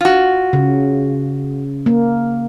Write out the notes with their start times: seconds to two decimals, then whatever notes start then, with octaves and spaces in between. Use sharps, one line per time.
0.01 F4 F#4
0.53 C#3
1.86 A#3